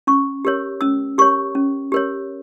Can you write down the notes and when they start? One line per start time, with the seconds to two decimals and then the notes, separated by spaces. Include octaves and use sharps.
0.07 C#4 C#6
0.45 G4 A#4 C#5
0.81 C#4 E6
1.18 G4 A#4 C#5 C#6
1.55 C#4
1.92 G4 A#4 C#5